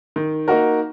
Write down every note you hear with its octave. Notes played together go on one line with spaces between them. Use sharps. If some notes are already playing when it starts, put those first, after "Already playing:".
D#3
A#3 D#4 F#4 A#4